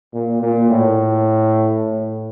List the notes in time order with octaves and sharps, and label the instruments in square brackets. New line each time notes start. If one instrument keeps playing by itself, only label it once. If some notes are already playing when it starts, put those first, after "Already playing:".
[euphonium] A#2
A#2
A2
A2